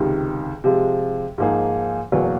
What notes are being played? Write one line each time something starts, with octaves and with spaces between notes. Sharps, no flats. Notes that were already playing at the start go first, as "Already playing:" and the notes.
Already playing: C#2 C3 D#3
C3 F3 G#3
G#2 F3 A#3 D#4 G#4
F#1 E2 B2 F#3 A#3